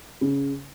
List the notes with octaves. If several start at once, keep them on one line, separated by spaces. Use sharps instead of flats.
C#3